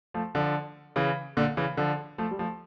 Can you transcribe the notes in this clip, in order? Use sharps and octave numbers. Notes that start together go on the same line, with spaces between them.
F3 A3
D3 F3
C#3 E3
A#2 D3
C#3 E3
D3 F3
F3 A3
G3
F3 A3